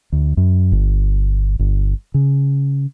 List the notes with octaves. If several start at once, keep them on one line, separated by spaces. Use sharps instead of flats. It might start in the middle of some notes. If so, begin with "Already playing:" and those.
D2
F#2
G1
G1
C#3